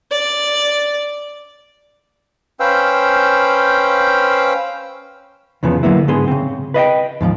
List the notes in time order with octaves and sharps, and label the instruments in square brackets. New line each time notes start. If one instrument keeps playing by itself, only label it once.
[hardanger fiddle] D5
[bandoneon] C#4 B4 C5 F5 G5 E6
[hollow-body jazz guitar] E2 C#3 F3 B3
D3 F#3 A#3 B3 E4
G#2 D3 B3 G#4 C6
C#3 C4
B4 D#5 F5 G5
D#2 G#2 E3 F3